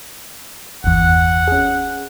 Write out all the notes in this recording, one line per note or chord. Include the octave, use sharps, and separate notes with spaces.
G1 E2 F#5
C#4 G#4